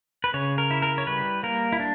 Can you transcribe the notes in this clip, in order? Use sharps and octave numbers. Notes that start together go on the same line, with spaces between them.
B4
C#3 C#5
A#4
E4
A#4
C#5
G3 B4
A#3 A#4
E4
D4